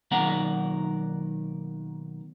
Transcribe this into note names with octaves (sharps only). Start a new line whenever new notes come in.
B1 D#3 A#3 A#4 F#5 A#5